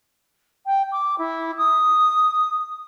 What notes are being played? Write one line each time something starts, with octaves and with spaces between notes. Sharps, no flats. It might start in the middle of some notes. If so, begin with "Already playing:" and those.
G5
D6
E4
D#6